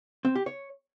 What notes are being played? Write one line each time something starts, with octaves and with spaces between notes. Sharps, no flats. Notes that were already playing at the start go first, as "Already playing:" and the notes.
C4
G4
C#5